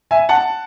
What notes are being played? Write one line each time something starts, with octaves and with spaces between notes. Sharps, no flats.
E5 G#5
F#5 A5